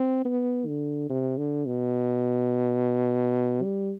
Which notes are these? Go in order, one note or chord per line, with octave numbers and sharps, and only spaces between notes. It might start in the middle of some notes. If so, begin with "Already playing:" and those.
Already playing: C4
B3
D3
C3
D3
B2
G3